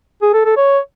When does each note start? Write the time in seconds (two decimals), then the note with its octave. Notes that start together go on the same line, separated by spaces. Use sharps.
0.22 G#4
0.34 A4
0.45 A4
0.57 C#5